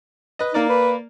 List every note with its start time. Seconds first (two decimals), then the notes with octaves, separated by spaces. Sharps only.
0.39 B4 D#5
0.54 A#3 D#4 A#4 D5
0.69 B4